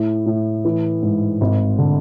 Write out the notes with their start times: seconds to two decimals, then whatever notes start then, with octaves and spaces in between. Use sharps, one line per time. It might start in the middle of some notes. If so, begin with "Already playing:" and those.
Already playing: A2
0.26 A2
0.65 E3
1.03 G#2
1.41 G#1
1.78 D3